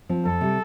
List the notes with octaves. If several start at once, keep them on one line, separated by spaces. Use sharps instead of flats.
F3 C4
F2 A4
C3 G3